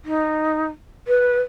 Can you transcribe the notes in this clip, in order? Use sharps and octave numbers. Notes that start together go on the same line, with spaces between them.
D#4
B4